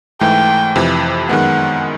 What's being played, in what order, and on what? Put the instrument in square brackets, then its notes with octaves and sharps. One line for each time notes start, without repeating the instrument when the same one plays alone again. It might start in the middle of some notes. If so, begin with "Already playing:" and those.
[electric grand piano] G#2 E3 A3 [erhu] G5
[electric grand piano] F2 C3 E3
[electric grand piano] F#2 D#3 G#3 B3 [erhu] F#5